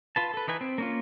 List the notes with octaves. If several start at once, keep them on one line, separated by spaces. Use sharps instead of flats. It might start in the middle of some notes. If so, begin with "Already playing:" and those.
F4 B4 A5
A4 B4
E3 D#4 B4 G#5
C4
A#3 C#4 F4